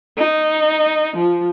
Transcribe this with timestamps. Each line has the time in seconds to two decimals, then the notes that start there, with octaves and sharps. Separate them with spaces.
0.18 D#4
1.17 F3